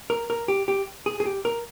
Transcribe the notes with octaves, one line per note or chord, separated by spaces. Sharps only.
A#4
A#4
G4
G4
G#4
G#4
G4
A#4